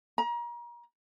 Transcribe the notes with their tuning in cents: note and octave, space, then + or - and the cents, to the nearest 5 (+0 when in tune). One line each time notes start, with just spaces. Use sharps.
A#5 +35